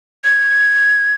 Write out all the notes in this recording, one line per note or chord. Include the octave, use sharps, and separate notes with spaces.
G#6